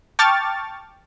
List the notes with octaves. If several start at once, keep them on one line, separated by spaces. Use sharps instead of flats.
G5 A5 C#6 D6 F6 A6